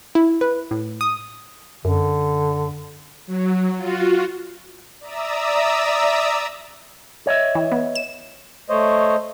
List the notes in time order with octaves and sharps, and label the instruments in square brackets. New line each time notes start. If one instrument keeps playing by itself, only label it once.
[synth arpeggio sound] E4
B4
A2
D#6
[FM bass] F#2 [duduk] D3
[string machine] F#3
F4 F#4
[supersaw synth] D5 E5 A#5 D#6 E6
[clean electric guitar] C#5 D#5 E5
[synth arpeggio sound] E3
B3
E7
[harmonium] A3 C5 C#5 D#5